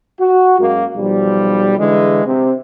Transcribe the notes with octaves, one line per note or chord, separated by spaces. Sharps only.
F#4
F#2 G#3 A#3
B1 F3 G3
D3 E3 G#3
C3